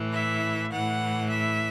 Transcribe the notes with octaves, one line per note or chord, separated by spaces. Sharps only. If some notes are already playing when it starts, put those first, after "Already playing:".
Already playing: A2 E3
E5
A2 E3 F#5
E5